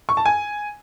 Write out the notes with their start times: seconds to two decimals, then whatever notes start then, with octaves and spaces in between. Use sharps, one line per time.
0.09 C#6
0.17 A5
0.25 G#5